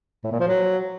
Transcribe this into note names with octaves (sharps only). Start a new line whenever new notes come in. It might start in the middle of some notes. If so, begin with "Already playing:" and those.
A2
A#2
F3
F#3